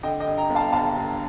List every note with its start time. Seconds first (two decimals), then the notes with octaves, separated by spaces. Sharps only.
0.03 D3 D#5 G5
0.20 D#5 G5
0.27 G2
0.38 G5 A#5
0.50 G1
0.55 F5 A5
0.72 G1 F5 A5
0.96 G2